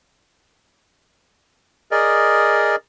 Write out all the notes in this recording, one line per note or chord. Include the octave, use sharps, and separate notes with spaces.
G#4 A#4 D5 D#5